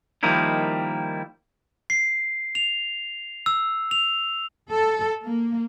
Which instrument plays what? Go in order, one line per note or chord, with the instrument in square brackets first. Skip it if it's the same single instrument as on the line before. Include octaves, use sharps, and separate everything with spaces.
[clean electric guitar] D#3 F3 G3 A#3 D#4 E4
[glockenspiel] C7
F7
E6
F7
[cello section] A4
A#3